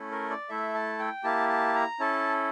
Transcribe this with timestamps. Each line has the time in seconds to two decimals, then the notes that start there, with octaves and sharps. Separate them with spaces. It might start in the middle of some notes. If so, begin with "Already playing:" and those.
Already playing: A3 C#4 E4 A4
0.12 A#4
0.30 D5
0.49 A3 E4 A4 E5
0.74 A5
0.99 G5
1.24 A#3 E4 G4 A5
1.49 A5
1.75 A#5
2.00 C#4 E4 A4 A5